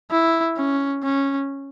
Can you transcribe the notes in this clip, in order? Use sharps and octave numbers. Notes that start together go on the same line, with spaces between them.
E4
C#4
C#4